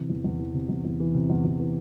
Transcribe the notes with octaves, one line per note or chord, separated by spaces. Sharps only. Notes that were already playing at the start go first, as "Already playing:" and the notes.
Already playing: C3 E3
E2
E2
E3
C3
E2
E2
E3
C3
E2
E2
E3